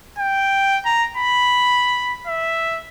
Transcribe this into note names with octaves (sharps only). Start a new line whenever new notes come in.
G5
A#5
B5
E5